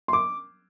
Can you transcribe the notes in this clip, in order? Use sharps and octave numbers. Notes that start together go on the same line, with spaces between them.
C6
D6